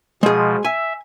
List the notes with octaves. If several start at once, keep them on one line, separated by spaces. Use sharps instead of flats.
B2 F3 G#3 G#4
E5 G#5